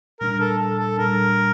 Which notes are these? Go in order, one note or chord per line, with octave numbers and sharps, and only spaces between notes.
A#2 G3 D4 A#4
A4
A4
A4
A#2 G3 D4 A#4